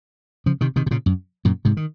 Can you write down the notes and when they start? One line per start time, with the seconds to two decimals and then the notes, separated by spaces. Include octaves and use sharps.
0.46 C#3 F3
0.61 C3 D#3
0.76 C3 D#3
0.86 C3
0.91 A#2 C#3
1.06 F#2
1.45 F#2 A#2
1.65 G#2 C3
1.77 D#3